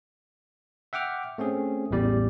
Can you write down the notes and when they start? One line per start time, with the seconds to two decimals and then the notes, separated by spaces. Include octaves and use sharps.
0.93 E5 F#5 G5 D6 F6
1.38 A3 C4 C#4 G#4
1.91 A1 E2 G3 D5